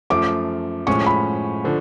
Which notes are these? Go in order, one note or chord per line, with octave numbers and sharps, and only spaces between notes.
F#2 F3 A3 D6
A2 F3 G#3 C#4 C#6
B5
D3 F3